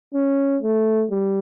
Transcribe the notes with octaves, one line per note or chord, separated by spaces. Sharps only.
C#4
A3
G3